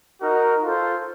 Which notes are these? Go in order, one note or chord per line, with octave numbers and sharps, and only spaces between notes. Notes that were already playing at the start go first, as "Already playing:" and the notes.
D#4 F#4 A#4 D#5
F4 A4 C5